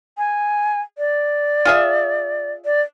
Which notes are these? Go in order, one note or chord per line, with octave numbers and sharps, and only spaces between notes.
G#5
D5
F4 G#4 E5
D5